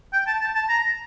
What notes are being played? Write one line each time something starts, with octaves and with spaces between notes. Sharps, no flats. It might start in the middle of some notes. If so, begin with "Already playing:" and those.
G5
A5
A5
A5
A#5